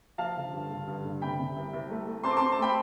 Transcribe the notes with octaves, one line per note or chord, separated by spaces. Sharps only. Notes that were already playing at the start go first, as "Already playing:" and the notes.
F3 F5 A5
D3
G2
D3
G2
D3
C3 G5 B5
C3
C2
C2
A3
A3
C4 A5 C6
D6
A5 C6
C4
A5
A3 G5 B5